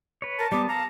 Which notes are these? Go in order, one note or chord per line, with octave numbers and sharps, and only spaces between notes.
B4 C#5
A#4 A5
G3 B3 D6
F5 A5 A#5